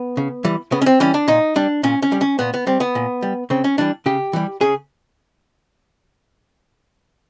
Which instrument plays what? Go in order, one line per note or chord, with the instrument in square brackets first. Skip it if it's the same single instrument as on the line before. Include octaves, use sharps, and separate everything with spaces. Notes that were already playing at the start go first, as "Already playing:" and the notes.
Already playing: [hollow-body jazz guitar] B3
C#3
E3 G3
C#3 B3
C#4
C4
E3 G3 C#4
D4
A#2 D#4
G3 D4
A#2 C#4
C#4
G3
C#4
A#2 B3
B3
G3 C4
B3
A#2
G3
C#3 C4
C#4
E3 G3 D4
C#3 G4
E3 G3
C#3 G#4